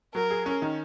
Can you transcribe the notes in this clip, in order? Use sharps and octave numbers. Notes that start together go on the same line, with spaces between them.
F#3 A#4
G#4
C#4
D#3